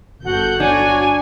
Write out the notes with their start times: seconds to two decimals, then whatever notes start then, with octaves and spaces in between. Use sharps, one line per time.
0.25 G1 F#4 A4 F#5 G6
0.60 D4 C#5 D5 G#5